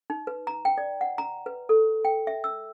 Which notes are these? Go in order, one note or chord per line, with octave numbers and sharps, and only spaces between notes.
D#4
B4
A#5
G5
D5
F#5
A#5
B4
A4
G5
E5
E6